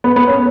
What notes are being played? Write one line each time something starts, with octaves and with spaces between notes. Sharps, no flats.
B3
B3
C#4